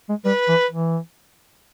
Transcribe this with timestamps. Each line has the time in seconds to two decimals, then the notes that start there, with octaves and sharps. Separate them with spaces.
0.09 G#3
0.24 G3 B4
0.48 E3
0.70 E3